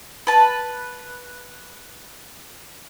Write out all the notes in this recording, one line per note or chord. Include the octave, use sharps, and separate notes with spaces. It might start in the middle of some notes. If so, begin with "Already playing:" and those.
B4 A5